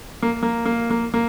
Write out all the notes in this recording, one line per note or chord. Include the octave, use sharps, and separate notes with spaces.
A#3
A#3
A#3
A#3
A#3